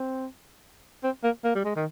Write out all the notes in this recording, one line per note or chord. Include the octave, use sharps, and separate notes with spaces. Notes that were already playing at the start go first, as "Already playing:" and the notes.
Already playing: C4
C4
A#3
A#3
G3
G#3
D#3